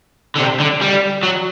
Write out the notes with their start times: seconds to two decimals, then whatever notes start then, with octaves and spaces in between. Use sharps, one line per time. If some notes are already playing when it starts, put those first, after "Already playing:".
0.36 D3
0.39 C3
0.60 D3
0.81 G3
1.23 F#3